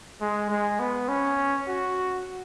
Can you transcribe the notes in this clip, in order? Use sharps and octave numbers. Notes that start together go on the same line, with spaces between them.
G#3
G#3
B3
C#4
F#4